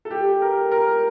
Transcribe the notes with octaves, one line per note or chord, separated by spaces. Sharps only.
A4
G4
A#4
A#4